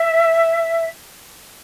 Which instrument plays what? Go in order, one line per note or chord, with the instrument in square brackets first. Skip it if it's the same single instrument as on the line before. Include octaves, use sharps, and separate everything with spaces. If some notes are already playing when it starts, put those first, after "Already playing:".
Already playing: [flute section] E5